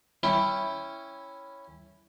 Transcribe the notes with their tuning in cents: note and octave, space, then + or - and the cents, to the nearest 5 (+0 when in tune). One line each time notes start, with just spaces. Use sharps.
C#4 +0 E4 +0 G5 +20